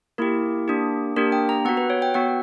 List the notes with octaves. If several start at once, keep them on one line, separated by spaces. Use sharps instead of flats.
A#3 E4 G4 A#4
A#3 D4 G4
A#3 D4 G4 A#4
G5
A#5
B3 F#4 F#5
B4
C#5
G5
B3 F#4 F#5